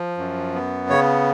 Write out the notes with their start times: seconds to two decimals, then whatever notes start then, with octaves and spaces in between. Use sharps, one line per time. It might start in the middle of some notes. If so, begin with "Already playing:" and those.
Already playing: F3
0.18 F#2
0.54 B3
0.89 C#3 C#5